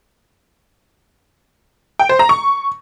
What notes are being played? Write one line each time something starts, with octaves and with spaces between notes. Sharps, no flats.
G5
C5
A#5
C#6